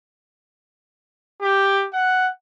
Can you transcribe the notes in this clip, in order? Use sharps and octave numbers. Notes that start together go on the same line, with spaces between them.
G4
F#5